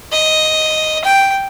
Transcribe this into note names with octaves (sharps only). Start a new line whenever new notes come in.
D#5
G5